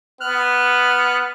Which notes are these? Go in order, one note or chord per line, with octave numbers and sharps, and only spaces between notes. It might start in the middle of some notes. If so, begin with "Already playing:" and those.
B3 F6 F#6